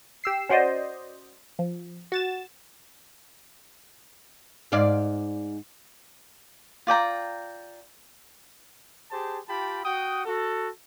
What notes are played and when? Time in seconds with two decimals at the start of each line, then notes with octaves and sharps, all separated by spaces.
0.24 G4 E6 C7
0.49 C#4 F#4 C5 D5 D#5
1.59 F3
2.12 F#4 A6 E7
4.72 G#2 D5 F5
6.87 F4 D5 G5 A#5
9.11 G4 G#4 C5 A5
9.48 F4 G4 G5 A5 B5
9.84 F#4 F#5 G5 D#6
10.26 F#4 A4